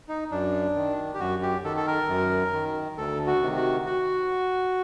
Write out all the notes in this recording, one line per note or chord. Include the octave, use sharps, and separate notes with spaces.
D#4
F#2 D4
D#3
G4
F#2 F#4
G4
D#3 A4
A4
A#4
F#2
D#3
D2 A4
F#4
C3 D#3
F#4
F#4